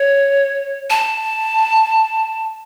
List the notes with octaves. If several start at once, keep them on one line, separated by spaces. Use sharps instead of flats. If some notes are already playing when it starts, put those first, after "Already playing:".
Already playing: C#5
A5